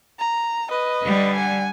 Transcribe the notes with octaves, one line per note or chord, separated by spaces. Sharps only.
A#5
B4 D#5
D3 G3
F#5 G#5